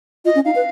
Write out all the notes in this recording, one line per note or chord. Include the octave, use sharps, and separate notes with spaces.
F4 D#5
C#4
D#4 F5
B4